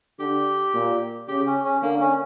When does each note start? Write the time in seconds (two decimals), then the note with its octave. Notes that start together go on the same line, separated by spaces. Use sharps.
0.19 D3 G4
0.74 A#2
1.28 C#3 G4
1.47 C#4
1.64 C#4
1.82 D3 A#3
2.00 C#4